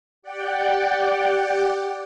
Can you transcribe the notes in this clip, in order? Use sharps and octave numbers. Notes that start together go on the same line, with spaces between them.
G4 D5 F#5 G5